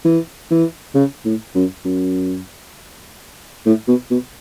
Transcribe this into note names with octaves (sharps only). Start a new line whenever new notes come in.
E3
E3
C#3
A2
F#2
F#2
A2
B2
B2